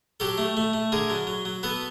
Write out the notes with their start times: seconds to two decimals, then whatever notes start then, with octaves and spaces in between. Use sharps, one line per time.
0.20 F#3 G4 A4
0.38 A3
0.57 A3
0.73 A3
0.92 D3 G#4 A#4
1.10 F#3
1.27 F#3
1.45 F#3
1.63 B3 A4 B4